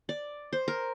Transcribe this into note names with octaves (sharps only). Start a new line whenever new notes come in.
D5
C5
A#4